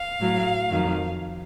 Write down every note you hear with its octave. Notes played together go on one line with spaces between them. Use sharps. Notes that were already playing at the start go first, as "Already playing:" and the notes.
Already playing: F5
A2 F#3
F2 D#3 F#3